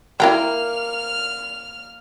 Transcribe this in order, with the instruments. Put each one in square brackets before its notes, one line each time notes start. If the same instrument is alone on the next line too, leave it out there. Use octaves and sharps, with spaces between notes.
[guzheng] A#3 [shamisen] E4 A#4 G5 [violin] F6